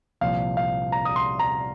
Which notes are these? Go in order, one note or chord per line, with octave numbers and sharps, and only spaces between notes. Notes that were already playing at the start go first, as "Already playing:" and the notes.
C2 A#2 F3 F5
F5
A#5
D#6
C6
A#5